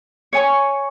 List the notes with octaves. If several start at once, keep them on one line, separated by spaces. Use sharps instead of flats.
C#5 G#5 C#6